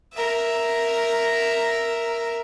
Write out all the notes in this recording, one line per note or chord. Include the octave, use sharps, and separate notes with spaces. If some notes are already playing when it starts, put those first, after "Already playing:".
A#4 E5